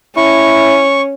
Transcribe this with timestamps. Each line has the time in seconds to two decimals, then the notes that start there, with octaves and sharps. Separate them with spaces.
0.17 C#4 E4 C#6